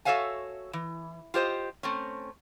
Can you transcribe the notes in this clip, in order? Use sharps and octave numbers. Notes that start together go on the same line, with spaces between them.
F#4 A4 C#5 E5 F5 G#5
E3
F4 G4 C5 D#5
A3 C4 C#4